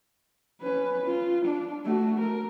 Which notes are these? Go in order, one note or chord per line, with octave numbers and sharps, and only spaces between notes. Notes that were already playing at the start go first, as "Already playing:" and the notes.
C#4 B4
F4
D4
A3 F#4
A#4